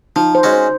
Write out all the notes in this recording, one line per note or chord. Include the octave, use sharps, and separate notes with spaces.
F3 D#4
C5
G#3 C#4 F#4
C5